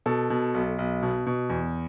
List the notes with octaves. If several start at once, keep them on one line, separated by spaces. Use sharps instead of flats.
B2 A4
B2
B1
B1
B2
B2
E2